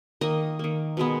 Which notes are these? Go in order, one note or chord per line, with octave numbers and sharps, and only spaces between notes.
D#3 A#3 D#5
D#3 A#3
B2 G#3 B3